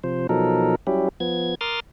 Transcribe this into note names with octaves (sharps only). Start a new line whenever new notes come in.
C3 F3 C5
B2 F3 F#3 D#4 A4 A#4
F#3 G3 C#4 E4 G4
F3 B3 G#6
A#4 C6 D6 D#6 F6 A6